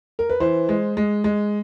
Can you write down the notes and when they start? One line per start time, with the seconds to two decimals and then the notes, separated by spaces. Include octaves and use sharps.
0.19 A#4
0.30 B4
0.40 E3 C5
0.69 G#3
0.97 G#3
1.24 G#3